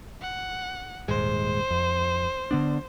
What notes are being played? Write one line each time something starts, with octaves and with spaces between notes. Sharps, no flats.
F#5
D#1 G#2 G#3 C5
F2
D3 B3 D4